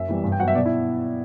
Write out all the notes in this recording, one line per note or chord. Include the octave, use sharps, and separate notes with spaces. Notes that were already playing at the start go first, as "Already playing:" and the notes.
Already playing: F#2 E5
E3 G3 B3
G2
G5
F#3 B3 F#5
E5
B2 D5
E4